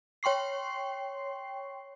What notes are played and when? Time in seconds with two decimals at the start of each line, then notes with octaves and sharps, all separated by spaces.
0.23 C#5 G5 C6 C#6 C7